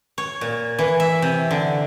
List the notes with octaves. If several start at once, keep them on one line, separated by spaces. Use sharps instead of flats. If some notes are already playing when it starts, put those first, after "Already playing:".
C#5
A#2
E3
E5
C3
D3